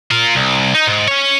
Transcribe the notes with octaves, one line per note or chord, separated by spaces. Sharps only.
F4 A#4
C2
D#4
G#2
C#4 C#5